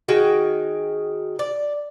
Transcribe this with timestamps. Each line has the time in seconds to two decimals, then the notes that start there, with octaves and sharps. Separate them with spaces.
0.08 D#3 F#4 G#4 G5
1.39 D5